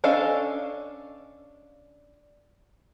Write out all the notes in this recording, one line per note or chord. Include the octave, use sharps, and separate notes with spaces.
C#4 D4 A4 D#5 F5